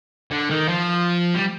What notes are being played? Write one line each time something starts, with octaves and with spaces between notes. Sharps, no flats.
D3
D#3
F3
G3